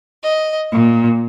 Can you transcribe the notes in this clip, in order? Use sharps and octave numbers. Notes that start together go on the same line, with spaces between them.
D#5
A#2